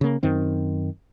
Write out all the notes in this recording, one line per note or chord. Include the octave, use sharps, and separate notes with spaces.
C#3 A#3
F#2 D#3 C4